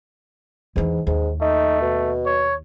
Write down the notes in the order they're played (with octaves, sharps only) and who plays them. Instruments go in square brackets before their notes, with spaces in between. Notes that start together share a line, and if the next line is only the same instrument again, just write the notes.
[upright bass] E2 E3 [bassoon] G#2
[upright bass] D#2 [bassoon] G#2
[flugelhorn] A3 [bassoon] D#4
[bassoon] B2
[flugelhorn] C#5